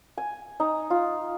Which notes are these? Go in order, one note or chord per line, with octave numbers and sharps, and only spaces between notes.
G#5
D#4
F4